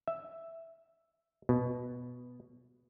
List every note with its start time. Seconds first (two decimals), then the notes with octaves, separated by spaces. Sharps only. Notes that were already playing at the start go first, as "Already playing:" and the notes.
0.08 E5
1.49 B2